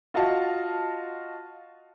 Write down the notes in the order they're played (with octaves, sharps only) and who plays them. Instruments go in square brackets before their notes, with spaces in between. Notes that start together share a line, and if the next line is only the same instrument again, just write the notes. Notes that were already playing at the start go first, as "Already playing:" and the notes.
[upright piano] F4 F#4 D#5 F5 A5